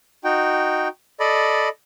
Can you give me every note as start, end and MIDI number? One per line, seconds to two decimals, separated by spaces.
0.24 0.88 63
0.24 0.88 66
0.24 0.88 79
1.20 1.69 69
1.20 1.69 74
1.20 1.69 75
1.20 1.69 83